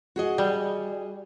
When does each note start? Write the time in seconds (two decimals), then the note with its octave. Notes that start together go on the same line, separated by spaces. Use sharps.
0.16 F#4 G#4 D#5
0.38 G3